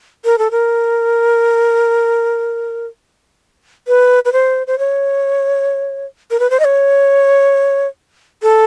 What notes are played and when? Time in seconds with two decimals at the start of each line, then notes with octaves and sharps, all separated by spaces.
0.25 A#4
0.38 A4
0.51 A#4
3.88 B4
4.25 B4
4.33 C5
4.67 C5
4.79 C#5
6.31 A#4
6.40 B4
6.50 C5
6.60 D#5
6.65 C#5
8.43 A4